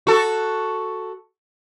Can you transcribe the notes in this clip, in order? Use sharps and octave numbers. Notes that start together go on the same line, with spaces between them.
F#4 A4